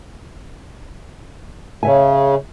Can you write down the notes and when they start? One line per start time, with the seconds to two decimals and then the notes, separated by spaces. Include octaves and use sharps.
1.83 C#3 C#5 E5 G#5